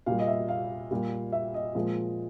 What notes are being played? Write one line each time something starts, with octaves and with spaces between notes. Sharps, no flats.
A#2 G3 F5
D#5
E5
F5
A#2 G3
E5
D#5
A#2 F3 G#3